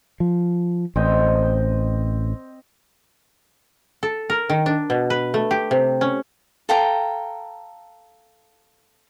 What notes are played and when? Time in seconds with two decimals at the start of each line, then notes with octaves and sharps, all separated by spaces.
0.20 F3
0.96 A1 C4 D#5 G5
4.03 A4
4.30 A#4
4.50 D#3
4.66 D4
4.90 B2
5.10 B4
5.34 A3
5.51 G4
5.71 C3
6.01 C#4
6.69 A4 F5 G5 A#5